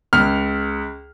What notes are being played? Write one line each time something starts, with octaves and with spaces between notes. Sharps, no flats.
C#2 F6